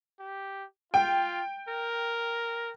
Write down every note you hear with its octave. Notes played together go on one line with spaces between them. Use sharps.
G4
F4 G5
A#4